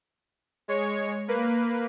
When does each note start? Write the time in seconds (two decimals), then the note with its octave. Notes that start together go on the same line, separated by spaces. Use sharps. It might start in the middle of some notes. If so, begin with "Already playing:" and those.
0.68 G#3 C#5 C#6
1.28 A#3 B4